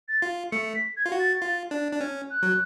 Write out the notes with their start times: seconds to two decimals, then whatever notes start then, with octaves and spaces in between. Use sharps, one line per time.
0.09 A6
0.22 F4
0.52 A3 C#7
0.75 B6
0.97 G#6
1.06 F4
1.12 F#4
1.20 A6
1.42 F4
1.71 D4
1.92 D4
2.00 C#4
2.31 F#6
2.43 F#3